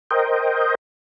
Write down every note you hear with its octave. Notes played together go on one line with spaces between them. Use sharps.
A#4 C5 D#5 G5